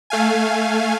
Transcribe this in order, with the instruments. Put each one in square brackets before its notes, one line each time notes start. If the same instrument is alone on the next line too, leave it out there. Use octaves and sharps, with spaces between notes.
[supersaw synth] A3 F5 G#5